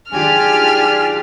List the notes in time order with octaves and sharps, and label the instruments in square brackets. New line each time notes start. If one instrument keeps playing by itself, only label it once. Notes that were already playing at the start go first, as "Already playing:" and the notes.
[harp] D#3 F#3 G#3 [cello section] D4 F4 G4 [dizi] G#5 [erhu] F6